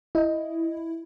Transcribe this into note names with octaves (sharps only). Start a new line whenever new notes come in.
E4 D#5